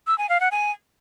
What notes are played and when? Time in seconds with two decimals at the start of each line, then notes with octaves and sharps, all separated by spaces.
0.07 E6
0.18 G#5
0.29 F5
0.40 F#5
0.52 G#5